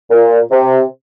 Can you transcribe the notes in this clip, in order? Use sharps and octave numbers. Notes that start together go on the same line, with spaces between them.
A#2
C3